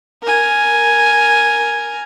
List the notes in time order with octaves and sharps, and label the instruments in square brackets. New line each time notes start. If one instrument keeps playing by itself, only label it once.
[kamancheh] A#4 G#5